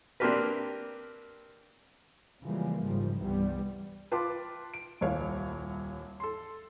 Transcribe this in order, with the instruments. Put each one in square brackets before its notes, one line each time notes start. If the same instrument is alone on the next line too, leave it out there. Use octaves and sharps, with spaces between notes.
[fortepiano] A#3 C4 D4 G4 A#4 B4
[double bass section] C#3 E3 F3 G3 G#3 A#3
G#1 G#2 C#3 F3 G3
C2 G2 C3 E3 G3 B3
[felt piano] F4 B4 G5 A5 C6 D6
D7
D#1 C2 C#5 F5
A4 C6